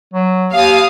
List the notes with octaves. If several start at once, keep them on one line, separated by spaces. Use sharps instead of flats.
F#3
D#2 F5 D#6